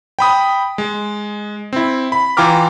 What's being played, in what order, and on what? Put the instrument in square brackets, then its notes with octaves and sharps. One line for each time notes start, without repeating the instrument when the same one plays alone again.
[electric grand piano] G5 B5 D#6
G#3
C4 E4
B5
E3 F4 G5 A#5 D6 F6